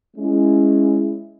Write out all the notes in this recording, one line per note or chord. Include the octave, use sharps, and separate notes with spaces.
G#3 C#4 E4